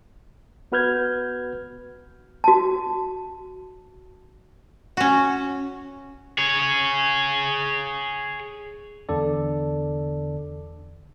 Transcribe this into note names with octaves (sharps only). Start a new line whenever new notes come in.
B3 F#4 B4 F6 G6 G#6
F#4 A5
C#4 F#4
G#4 C#5
E2 D3 A4 D5